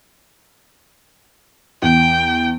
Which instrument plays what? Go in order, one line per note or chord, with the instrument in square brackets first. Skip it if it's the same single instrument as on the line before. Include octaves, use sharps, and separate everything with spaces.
[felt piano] E2 [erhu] G5